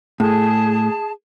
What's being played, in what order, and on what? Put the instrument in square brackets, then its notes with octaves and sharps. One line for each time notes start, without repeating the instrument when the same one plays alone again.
[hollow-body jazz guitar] A2 [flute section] G#4 A5